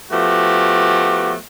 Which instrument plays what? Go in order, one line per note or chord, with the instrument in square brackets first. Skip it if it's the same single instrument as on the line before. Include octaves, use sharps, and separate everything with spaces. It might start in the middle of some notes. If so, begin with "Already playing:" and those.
[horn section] F3 A3 B3 F#4 G4